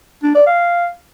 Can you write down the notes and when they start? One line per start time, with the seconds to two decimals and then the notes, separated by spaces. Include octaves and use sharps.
0.23 D4
0.35 D5
0.46 F5